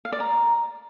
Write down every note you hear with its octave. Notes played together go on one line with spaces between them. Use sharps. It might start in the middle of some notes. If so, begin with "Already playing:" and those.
F5
D5
A#5